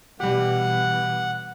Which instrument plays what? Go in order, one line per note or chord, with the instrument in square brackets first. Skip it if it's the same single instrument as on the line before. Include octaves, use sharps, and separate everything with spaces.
[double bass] B2 E3 [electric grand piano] G3 G4 [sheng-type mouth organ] F#5